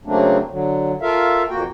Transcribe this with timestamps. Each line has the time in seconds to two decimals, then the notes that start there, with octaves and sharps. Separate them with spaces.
0.05 C#3 F#3 A3 A#3 C4 D4
0.50 D3 F#3
1.01 F4 A4 A#4 E5 F5
1.49 F2 A#2 A#3 F#4 G5